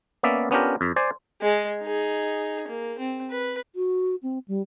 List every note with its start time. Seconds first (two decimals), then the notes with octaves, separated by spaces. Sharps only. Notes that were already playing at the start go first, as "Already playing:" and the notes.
0.23 A#3 B3 C#4 D5 E5
0.51 B3 C#4 D4 F4 G4 A#4
0.81 F2
0.96 C5 D5 G#5
1.41 G#3 G#4
1.82 D#4 G#4
2.68 A#3
2.99 C4
3.30 B4
3.75 F#4
4.23 C4
4.48 G3